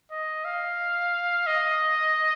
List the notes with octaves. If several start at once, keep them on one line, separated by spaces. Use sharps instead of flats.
D#5
F5
D#5